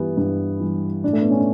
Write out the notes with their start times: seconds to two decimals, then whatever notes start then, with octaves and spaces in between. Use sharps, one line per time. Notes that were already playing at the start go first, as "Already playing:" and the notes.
Already playing: G2 E3 G3 B3
0.17 G2
0.60 E3 G3
1.04 A2 D4
1.13 A3
1.22 B3
1.30 C#4
1.38 D4